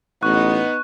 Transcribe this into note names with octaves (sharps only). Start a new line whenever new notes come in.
A1 B3 D#4 C#6 F#6